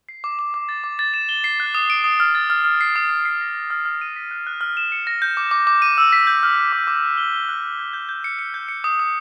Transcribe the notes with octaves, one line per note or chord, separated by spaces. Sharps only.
C7
D6
D6
D6
A6
D6
A6
E7
G7
C7
F#6
D#6
D7
D#6
F6
A6
F6
F6
C7
D#6
D#6
C7
A#6
A#6
F6
F6
D#7
B6
F#6
F#6
F6
E7
C#7
A#6
G6
D6
D6
D6
D#7
E6
B6
G6
F6
F6
D6
D6
F#6
G7
G7
F#6
G6
G6
G6
G6
C#7
C#7
G6
C#7
D#6
D#6